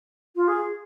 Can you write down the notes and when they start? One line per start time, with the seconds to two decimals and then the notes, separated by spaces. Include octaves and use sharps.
0.35 F4
0.47 G#4